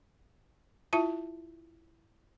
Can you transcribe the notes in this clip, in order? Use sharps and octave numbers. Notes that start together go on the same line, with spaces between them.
E4 F4 E5 A5